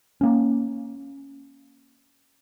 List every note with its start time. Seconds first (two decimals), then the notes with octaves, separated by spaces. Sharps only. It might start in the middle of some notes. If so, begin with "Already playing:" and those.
0.21 A#3 C#4